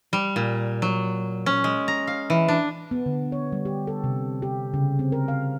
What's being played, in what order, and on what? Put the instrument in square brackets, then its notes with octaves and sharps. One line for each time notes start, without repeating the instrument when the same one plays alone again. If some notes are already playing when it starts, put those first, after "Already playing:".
[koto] G3
A#2
F#3
C#4
G#3
A#5
F5
E3
D4
[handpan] B3
D3
C#5
G3
G4
A4
C3
G4
C#3
C4
A#4
F5